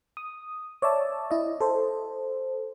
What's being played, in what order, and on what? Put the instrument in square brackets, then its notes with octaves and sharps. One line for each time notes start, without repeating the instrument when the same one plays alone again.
[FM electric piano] D#6
C#5 D5 E5 A5
E4 D#5
A4 C5